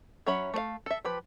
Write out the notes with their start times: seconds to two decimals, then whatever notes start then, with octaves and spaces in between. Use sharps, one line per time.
0.26 F#3 C#4 C#5 E5 B5
0.54 A3 C5 F5
0.86 A4 E5
1.05 F3 G4 B4